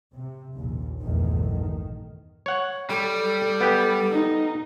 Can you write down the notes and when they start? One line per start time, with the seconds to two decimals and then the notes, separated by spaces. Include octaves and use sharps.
0.14 C3
0.56 A#1 D#2 A#2
1.01 A#1 E2 G2 A#2 D#3 A3
1.53 D#3
2.46 C#5 F#5
2.90 G3 A4
3.61 B3 G4
4.11 D#4